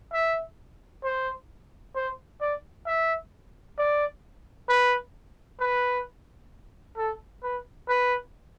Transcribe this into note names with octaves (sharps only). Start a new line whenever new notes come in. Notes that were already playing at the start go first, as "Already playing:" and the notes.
E5
C5
C5
D5
E5
D5
B4
B4
A4
B4
B4